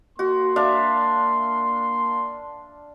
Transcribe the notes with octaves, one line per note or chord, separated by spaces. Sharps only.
A#3 F#4 C6
D4 E5 F5